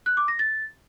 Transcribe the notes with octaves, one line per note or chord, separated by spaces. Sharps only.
F#6
D6
A#6
A6